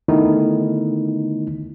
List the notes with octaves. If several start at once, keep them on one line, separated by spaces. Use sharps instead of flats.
D3 D#3 A3 B3 D#4 E4